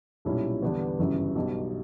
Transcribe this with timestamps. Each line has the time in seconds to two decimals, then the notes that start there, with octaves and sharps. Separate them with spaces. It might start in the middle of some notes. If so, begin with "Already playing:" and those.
0.25 B1 A#2 G3 C#4 E4
0.62 E2 D3 G3 B3 D4
0.99 G1 F#2 C#3 E3 G3
1.35 B1 B2 G3